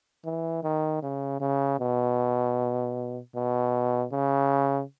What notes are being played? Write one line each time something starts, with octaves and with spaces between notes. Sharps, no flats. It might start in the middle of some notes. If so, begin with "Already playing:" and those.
E3
D#3
C#3
C#3
B2
B2
C#3